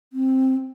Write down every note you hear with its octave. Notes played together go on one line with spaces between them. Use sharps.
C4